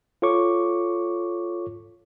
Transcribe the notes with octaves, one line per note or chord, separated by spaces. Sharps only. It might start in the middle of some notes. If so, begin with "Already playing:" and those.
F4 A4 C#5 C#6 D6